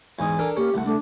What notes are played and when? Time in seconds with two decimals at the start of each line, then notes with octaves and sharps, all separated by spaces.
0.19 E2 G#2 D#5 G#5
0.39 D4 A4 A#4
0.57 A#3 C#4 G4
0.74 C2 A3 F#5
0.86 A3 D4